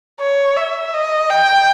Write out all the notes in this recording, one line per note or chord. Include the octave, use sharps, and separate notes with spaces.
C#5
E5
D#5
G5